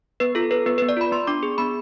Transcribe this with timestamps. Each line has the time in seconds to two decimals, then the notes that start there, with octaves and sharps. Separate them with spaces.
0.20 B3 B4
0.35 F4 A4
0.51 A4 B4
0.66 B3 B4
0.78 B3 B4
0.89 D5
0.97 F4 B5
1.12 B3 C6
1.27 D4 D6
1.43 G#4
1.58 B3 B5